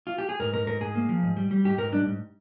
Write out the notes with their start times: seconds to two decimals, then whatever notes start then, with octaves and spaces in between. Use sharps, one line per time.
0.07 F4
0.18 G4
0.29 G#4
0.40 G#2 A#4
0.54 G#2 A#4
0.67 G#2 A#4
0.81 G#2 G#4
0.95 A#3
1.09 F3
1.23 G#2
1.37 G3
1.51 G3
1.64 G#2 G4
1.78 G#2 A#4
1.92 G3 D4
2.06 G#2